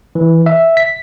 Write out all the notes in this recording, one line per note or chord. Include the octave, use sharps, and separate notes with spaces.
E3
E5
B6